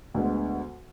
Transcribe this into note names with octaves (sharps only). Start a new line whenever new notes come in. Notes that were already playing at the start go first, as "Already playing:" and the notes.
D2 D3 G#3 B3